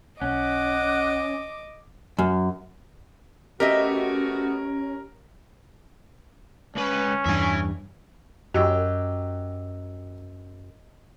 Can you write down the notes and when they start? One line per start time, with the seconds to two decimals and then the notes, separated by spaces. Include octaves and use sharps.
0.21 B1 C#4 D#5 F#5 D6
2.18 F#2
3.60 A3 B3 C#4 F#4 G4 A#4 D#5 E5
6.75 C#2 C#4 B4
7.26 E2 G2 E5 G#5
8.54 F#2 F#3 G4 D#5 E6